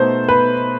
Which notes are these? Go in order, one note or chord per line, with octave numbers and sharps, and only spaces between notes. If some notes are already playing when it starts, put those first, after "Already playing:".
Already playing: B2 A3 D#4 C5
B4